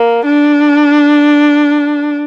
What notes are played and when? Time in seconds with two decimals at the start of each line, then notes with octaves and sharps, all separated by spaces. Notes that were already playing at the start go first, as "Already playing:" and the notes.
Already playing: A#3
0.25 D4